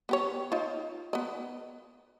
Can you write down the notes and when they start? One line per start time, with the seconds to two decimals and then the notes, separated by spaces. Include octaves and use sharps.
0.09 B3 G4 C#5
0.52 D#4 F4
1.13 B3 D#5